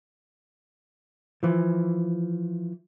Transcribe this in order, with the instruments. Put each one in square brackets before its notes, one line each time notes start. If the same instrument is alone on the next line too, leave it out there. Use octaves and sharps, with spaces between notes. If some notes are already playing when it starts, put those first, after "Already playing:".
[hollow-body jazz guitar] E3 F3